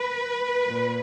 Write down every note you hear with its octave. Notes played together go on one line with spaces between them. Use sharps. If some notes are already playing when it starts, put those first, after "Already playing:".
Already playing: B4
A#2